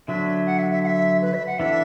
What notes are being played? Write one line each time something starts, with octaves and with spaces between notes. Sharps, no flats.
D3 F#3 D4 E5
F#5
E5
E5
F#5
E5
B4
E5
F#5
E3 D4 A4 E5